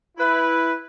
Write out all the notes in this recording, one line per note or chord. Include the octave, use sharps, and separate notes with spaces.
E4 B4